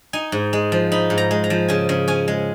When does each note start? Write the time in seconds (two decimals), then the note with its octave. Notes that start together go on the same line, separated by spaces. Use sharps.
0.13 D#4 G#5
0.32 G#2
0.53 G#3
0.72 F3
0.92 D#4 B5
1.10 G#2
1.18 A#5
1.31 G#3
1.44 A#5
1.50 F3
1.68 C#3 G#5
1.89 C#3
2.08 C#4 G#5
2.28 G#3